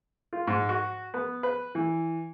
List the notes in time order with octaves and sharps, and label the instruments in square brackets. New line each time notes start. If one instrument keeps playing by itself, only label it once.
[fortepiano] F4
G#2
F#4
B3
B4
E3